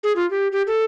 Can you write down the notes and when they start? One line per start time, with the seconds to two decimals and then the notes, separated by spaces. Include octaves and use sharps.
0.04 G#4
0.16 F4
0.30 G4
0.52 G4
0.67 A4